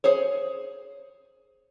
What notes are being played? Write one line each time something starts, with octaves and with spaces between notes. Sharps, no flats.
G#4 C5 C#5